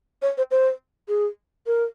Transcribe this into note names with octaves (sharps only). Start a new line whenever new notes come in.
C#5
C5
C5
G#4
A#4